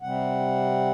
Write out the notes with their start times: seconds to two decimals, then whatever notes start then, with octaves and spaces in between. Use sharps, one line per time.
0.02 C3 G3 C4 F#5